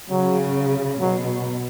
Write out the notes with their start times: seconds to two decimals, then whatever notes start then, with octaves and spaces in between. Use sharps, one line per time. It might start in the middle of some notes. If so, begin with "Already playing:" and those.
0.10 C#3 F#3
1.01 B2 F#3